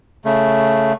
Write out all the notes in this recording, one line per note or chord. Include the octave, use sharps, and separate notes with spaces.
C#3 A3